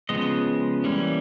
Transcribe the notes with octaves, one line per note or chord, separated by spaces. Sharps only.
C#3 F3 G#3 B3 D#5
E3 G3 A#3 C#4